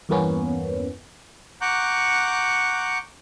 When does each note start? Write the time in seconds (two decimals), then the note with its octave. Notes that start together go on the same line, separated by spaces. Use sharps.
0.09 E2 G2 E3 A#3 B3 C#4
1.61 F#5 A#5 C#6 D6 F#6 G6